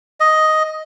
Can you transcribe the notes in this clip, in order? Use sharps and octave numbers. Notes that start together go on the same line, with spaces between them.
D#5